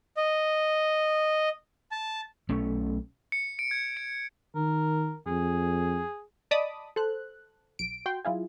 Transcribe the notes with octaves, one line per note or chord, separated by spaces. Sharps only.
D#5
A5
B1 A3 C#4
C#7
D7
G#6
D7
D#3 A#4
F2 G#4
D5 D#5 A5 B5 D6 D#6
A4 C5 F#6
B1 D7
F#4 G5 C6
F#3 E4 F4 G#4